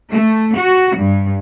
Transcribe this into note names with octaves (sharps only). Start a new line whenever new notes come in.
A3
F#4
G2